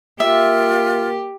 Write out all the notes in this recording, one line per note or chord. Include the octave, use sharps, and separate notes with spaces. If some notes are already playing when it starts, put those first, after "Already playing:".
A#3 F4 G4 E5